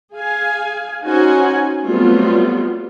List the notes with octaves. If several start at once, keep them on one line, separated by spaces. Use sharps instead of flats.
G#4 F5 G#5
C#4 D#4 F#4 C5 F#5 G#5
F#3 G3 A3 B3 C4 F4